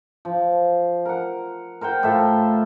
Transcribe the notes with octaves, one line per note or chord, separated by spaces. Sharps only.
F3
A#4 F#5
A#4 C5 F#5 G5
A2 F4 A4 E5